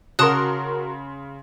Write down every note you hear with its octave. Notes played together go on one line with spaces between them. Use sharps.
C#3 F#4 A#4 A5 C6 D#6 F#6